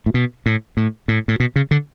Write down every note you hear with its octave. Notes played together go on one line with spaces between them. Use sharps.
A2
B2
A2
A2
A2
A2
B2
C#3
D3